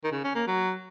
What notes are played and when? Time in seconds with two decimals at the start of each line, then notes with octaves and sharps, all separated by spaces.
0.04 D#3
0.12 C#3
0.24 C#4
0.35 A#3
0.47 F#3